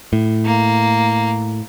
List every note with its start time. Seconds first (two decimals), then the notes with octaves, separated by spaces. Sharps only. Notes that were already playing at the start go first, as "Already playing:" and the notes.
0.13 A2
0.45 A#3